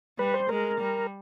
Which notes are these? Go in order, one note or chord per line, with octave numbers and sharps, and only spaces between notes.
G3 B4
C5
G#3 A#4
G3